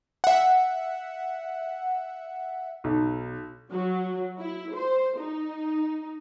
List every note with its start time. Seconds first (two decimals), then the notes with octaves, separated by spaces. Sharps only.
0.24 E5 F#5
2.84 B1
3.71 F#3
4.40 E4
4.75 C5
5.18 D#4